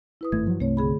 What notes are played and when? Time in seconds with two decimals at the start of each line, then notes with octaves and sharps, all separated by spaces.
0.21 E4 B4 D#6
0.32 G#1 G2 A3 G#6
0.47 F3 F#3
0.60 C2 C3 A3 C#5
0.77 D3 G#4 B5